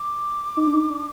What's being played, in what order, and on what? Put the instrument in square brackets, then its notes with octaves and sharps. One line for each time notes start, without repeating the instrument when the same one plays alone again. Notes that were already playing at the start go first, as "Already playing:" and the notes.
Already playing: [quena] D6
[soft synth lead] D#4
D4
D#4
D4